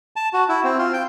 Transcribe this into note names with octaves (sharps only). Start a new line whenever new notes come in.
A5
F#4
E4
C4
F4
G5